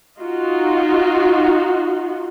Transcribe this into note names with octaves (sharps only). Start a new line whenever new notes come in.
D#4 F4 F#4